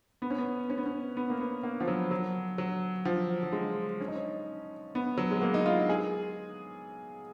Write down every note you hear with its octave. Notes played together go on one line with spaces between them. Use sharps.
B3
C#4
B3
C#4
B3
C#4
B3
A#3
B3
A#3
F3
F#3
F#3
F#3
F3
F#3
G#3
C#4
D#4
C#4
B3
F#3
G#3
A#3
D#4
F4
G#4